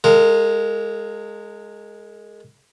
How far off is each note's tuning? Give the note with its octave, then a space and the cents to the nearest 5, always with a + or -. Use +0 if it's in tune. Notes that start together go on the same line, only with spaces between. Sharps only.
G#3 +0 A#4 -35 F5 +10